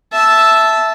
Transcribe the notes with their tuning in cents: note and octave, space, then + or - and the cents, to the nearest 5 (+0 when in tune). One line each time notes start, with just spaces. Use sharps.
E5 +0 A5 -10